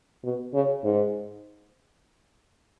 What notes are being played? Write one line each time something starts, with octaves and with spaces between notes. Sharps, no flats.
B2
C#3
G#2